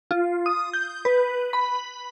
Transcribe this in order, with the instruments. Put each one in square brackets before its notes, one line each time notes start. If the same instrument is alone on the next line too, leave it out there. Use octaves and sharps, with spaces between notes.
[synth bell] F4
D#6
G6
B4
B5